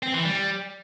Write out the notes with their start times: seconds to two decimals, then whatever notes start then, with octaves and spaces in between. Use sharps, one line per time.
0.03 C4
0.14 E3
0.25 G3